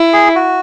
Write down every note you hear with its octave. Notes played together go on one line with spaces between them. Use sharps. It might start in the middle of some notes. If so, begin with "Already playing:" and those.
Already playing: E4
G#4
F#4